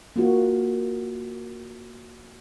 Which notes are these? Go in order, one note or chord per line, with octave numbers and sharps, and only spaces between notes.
A#3 F4 F#4